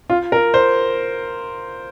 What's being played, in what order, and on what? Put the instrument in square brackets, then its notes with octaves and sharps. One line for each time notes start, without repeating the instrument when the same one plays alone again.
[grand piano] F4
A#4
C5